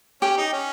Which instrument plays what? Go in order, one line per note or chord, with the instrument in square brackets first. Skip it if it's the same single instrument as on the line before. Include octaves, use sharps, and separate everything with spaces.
[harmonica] C#4 [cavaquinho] G4
[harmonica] D#4
C#4